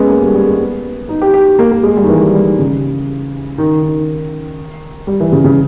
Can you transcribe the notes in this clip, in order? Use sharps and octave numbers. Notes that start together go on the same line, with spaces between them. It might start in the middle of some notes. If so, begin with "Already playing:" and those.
Already playing: G#3 B3 C#4
A#3
G3
G3
G#3
B3
D#4
G4
G4
A#3
A#3
G#3
G3
D#3
E3
G3
G3
D#3
C#3
D#3
D#3
G3
E3
C#3
C#3